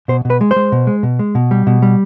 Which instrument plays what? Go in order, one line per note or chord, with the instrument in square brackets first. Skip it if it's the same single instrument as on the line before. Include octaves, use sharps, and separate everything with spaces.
[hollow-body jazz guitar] B2 C5
B2
B4
G#3
C5
G#3
B2
G#3
B2
G#3
B2
G3
B2
G3